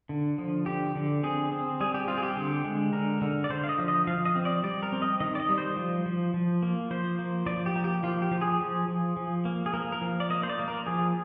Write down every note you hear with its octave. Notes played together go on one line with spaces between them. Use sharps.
D3
F3
D3 G4
D3
C4 G#4
C4
G3 G#4
G4
C4 F4
G#4
G4
D3
G#3
D3 A#4
D3
D5
D3 C5
F5
D#5
F3
D#5
F3 F5
D#5
C4
D5
G3 D5
A#4
C4
D#5
D#3 D#5
D5
D#5
G3
C5
F3
F3
F3
A#3
F3 C5
A#3
F3 D5
G4
A#3
G4
F3 F4
G4
F3
G#4
F3
F3
F3
A#3
G#4
A#3 A#4
A#4
F3
D5
A#3 D#5
C5
D5
A#3
A#4
F3 G#4